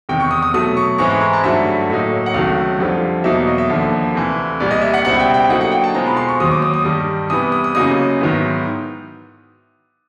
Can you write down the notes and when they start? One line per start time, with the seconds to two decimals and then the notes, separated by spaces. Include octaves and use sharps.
0.09 E2 C3 D#3 G5
0.20 C#6
0.31 D#6
0.42 D#6
0.54 B2 F#3 A3 D#6
0.77 C#6
0.98 G#2 E3 G#3 C4 E4 C#6
1.10 C#6
1.21 A#5
1.33 A5
1.44 G2 D3 F#3 A3 E5
1.90 A2 F#3 A#3 D#4
2.26 F#5
2.34 C#2 C3 D#3 F#3 A3 F5
2.79 F2 D3 G3 C4 F4
3.24 E2 B2 F#3 A#3 D#4 E5
3.47 D#5
3.58 E5
3.69 D#2 D3 F3 A#3
4.15 D2 C3 E3
4.60 C2 A#2 G3
4.71 D#5
4.82 E5
4.94 F#5
5.05 C#2 B2 G3 C4 E4 F#5
5.19 G5
5.34 G5
5.49 D3 F#3 A#3 D#4 F#5
5.61 F#5
5.72 G5
5.84 A5
5.95 B2 G#3 C4 F4 A#5
6.07 B5
6.17 C6
6.29 C#6
6.40 D#2 D#3 F#3 D#6
6.51 D6
6.62 D#6
6.74 D#6
6.85 G2 D#3 G3
7.30 C3 E3 G3 B3 D#6
7.52 D#6
7.64 D#6
7.75 F#2 C#3 F#3 A#3 D#4 D#6
8.20 G#2 D#3 F#3 B3 E4